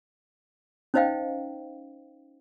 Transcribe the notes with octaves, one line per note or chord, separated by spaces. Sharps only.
C#4 D#4 C5 D#5 F5 G5